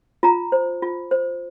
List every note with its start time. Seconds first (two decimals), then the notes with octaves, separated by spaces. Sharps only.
0.23 F4 A#5
0.52 C5
0.82 F4
1.11 C5